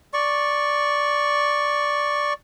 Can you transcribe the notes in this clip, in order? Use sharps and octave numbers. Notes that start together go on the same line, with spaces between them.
D5 C#6